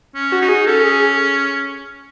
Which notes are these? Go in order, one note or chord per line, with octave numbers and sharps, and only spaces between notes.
C#4
F#4
D#4
G#4
C#4 A4
G#4